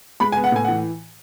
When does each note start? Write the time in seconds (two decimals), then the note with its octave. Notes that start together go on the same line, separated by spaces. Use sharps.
0.20 G#3 B5
0.32 G#5
0.37 B3
0.44 F#5
0.52 A2 G#5
0.65 E3 F#5